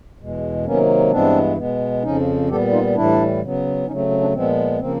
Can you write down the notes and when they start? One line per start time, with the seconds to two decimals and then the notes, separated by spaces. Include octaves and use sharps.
0.19 E2 B2 G#3
0.65 C3 D#3 F#3 A#3 B3 C#4
1.11 G2 E3 G#3 B3 C4 D4
1.57 B2 G#3 B3
2.02 F2 C#3 F3 C#4 D#4
2.49 A#2 G3 B3 G4 A4
2.72 D#4 F4
2.95 A2 E3 G3 D4 E4
3.41 C#3 F#3 B3
3.87 C#3 F#3 A3 C#4 D#4
3.98 C4
4.10 C4
4.21 C4 D4
4.33 A#2 F3 G#3 B3 C4
4.79 C#3 F3 A#3 C4